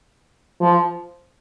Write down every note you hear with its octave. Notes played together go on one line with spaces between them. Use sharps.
F3